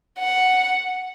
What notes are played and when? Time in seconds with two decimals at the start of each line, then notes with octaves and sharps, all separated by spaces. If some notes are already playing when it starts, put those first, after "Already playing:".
0.19 F#5